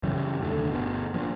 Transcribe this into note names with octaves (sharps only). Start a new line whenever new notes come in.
F#2 C#3 E3 G3
F1 D#2 D3 A3
G1 B2
F3 A#3 D4